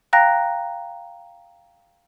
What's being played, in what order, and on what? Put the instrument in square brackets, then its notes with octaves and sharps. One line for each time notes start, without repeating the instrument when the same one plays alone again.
[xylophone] F5 G5 A#5 F#6 A#6